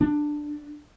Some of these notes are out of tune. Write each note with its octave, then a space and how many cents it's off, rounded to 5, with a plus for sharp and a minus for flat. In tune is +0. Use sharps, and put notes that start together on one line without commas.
D4 +10